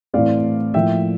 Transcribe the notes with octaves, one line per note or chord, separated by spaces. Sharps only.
A2 E3 A3 C4 D5 F5
A2 F3 A#3 E5 G5